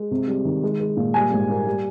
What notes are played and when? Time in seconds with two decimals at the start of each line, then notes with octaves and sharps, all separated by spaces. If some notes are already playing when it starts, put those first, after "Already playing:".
Already playing: G#3
0.11 C3
0.28 G3
0.45 D#3
0.63 G#3
0.80 G#3
0.97 A#2
1.14 G3 G#5
1.32 G#2
1.49 A#3
1.66 G3